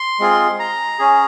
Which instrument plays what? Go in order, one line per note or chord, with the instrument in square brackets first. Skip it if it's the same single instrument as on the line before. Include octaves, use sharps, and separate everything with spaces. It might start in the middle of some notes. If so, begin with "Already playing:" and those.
Already playing: [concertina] C6
G#3 C4 F4 G#4
A#5
C#4 G#4